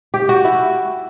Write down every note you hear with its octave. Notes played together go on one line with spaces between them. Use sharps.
G4
F#4
E4